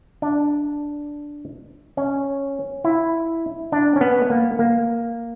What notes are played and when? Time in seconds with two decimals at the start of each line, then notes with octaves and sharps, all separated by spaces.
0.22 D4
1.97 C#4
2.84 E4
3.72 D4
3.96 C#4
4.01 B3
4.30 A#3
4.59 A#3